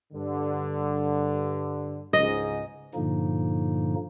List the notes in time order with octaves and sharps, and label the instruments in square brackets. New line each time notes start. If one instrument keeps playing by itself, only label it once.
[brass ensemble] G2 D3
[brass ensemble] C#2 G#2 [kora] D#5
[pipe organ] G2 A#2 D3 F3 A#3 D#4